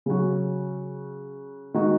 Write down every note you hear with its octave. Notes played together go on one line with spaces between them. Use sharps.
C#3 F#3 C#4 F#4
D#3 G#3 D#4 F#4